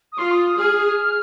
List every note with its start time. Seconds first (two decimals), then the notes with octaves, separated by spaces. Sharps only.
0.12 D#6
0.18 F4 C6
0.31 D#6
0.44 D#6
0.57 G#4 F6